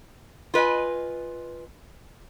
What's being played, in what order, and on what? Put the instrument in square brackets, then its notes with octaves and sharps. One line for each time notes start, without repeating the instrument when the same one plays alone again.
[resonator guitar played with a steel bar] F4 B4 D#5 G#5